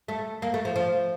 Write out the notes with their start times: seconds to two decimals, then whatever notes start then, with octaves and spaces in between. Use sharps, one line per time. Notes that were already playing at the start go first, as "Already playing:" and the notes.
0.08 A3
0.42 A#3
0.54 A3
0.65 F3
0.76 F3